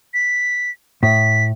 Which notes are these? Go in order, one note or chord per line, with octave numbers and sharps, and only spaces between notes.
B6
A2 B6